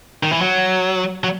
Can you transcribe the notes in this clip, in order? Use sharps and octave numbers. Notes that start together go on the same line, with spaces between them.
D#3
E3
F#3
F#3